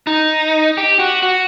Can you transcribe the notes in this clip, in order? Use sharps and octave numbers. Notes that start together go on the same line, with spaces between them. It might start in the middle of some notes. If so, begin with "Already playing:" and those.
D#4
G4
F#4
F#4